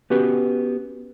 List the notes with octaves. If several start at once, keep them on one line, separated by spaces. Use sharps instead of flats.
B3 C#4 F#4 G4 B4